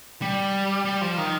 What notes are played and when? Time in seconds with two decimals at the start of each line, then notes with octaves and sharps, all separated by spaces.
0.22 G3
0.85 G3
1.01 F3
1.18 D#3